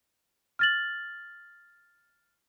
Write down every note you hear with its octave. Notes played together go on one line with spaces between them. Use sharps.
F6 A6 F#7